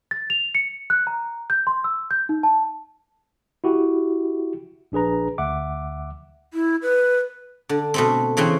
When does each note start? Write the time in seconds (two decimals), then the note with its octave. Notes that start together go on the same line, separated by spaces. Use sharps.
0.11 A6
0.30 F7
0.55 C#7
0.90 F#6
1.07 A#5
1.50 G6
1.67 C6
1.84 E6
2.11 G6
2.29 D#4
2.43 A5
3.64 E4 F#4 G4
4.92 A#1 D4 G#4 B4 A#5
5.38 D2 E5 F#5 D6
6.54 E4
6.82 B4
7.69 D3
7.94 B2 A3 C4
8.37 C#3 E3 C4 C#4